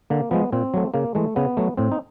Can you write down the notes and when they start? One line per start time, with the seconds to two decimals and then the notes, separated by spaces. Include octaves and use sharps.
0.10 D3 A#3
0.31 F3 G#3 B3
0.52 A#2 C4
0.74 F#3 A3
0.94 C#3 A#3
1.15 E3 G#3 A3
1.36 C#3 B3
1.57 F#3 A3
1.77 A2 C4
1.92 D#4